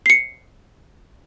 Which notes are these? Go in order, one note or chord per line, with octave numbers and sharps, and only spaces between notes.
C7 C#7